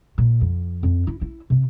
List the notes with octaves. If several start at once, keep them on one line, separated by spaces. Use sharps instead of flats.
A#2
F2
F2
E4
E4
C3